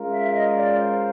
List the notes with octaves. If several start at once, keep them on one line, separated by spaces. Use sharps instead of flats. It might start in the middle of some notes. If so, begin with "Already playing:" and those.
Already playing: G#3 C#4 F4 A#4
E5
D#5
D5
C5